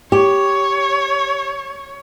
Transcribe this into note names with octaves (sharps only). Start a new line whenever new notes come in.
G4 C#5